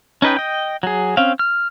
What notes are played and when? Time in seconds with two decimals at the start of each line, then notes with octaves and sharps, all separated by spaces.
0.22 C#4 D#4 B4 D#5 G5
0.37 D#5 G5
0.83 F#3 G#4
1.17 C4 C#4 F5
1.39 F6